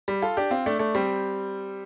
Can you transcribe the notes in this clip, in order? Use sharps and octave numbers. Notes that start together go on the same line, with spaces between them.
G3
F4 A4
D4 G4
C4 F4
A3 D4
A3 D4
G3 C4